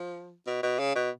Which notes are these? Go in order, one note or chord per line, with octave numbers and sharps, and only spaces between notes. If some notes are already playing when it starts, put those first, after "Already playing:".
Already playing: F3
B2
B2
C#3
B2